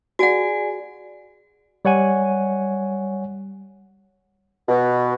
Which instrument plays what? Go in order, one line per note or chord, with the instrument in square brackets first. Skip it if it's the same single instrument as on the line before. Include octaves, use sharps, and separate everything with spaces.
[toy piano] F#4 F#5 [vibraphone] G#4 D5 G#5
[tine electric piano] G3 C#5 F#5 G#5
[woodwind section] B2